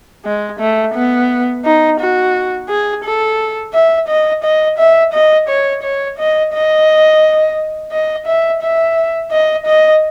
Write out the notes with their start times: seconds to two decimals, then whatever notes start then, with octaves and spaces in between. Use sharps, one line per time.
0.25 G#3
0.60 A3
0.94 B3
1.65 D#4
2.00 F#4
2.69 G#4
3.04 A4
3.74 E5
4.08 D#5
4.43 D#5
4.78 E5
5.13 D#5
5.49 C#5
5.83 C#5
6.18 D#5
6.53 D#5
7.92 D#5
8.26 E5
8.62 E5
9.31 D#5
9.66 D#5